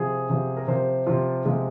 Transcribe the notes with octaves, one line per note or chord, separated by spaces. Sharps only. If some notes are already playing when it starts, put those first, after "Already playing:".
Already playing: C3 F3 G#4
C3 F3
A#4
C3 F3 C5
C3 F3 F4
C3 F3 G#3